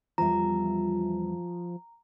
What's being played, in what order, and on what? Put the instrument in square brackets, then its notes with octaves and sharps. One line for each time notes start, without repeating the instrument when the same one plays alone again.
[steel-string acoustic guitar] E2 G3 E5 [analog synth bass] F3 [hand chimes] A#5